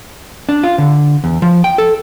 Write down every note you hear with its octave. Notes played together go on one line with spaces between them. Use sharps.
D4
F4
D3
E2
F3
G5
A4